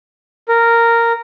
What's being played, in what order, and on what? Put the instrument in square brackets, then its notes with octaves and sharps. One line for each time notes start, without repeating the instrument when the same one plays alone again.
[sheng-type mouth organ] A#4